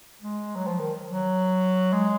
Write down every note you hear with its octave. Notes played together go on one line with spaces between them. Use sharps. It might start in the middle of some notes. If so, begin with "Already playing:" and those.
G#3
F#3
F3
D#3
F#3
G#3